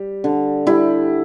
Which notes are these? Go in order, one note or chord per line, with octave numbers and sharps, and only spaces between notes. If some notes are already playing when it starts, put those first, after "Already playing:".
Already playing: G3
D3
G3 E4